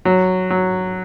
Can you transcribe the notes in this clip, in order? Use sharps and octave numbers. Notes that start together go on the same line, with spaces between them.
F#3
F#3